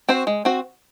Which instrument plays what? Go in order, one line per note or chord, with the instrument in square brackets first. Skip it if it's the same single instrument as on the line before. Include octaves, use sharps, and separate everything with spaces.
[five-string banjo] C4 F#4 C5
G#3
C4 F#4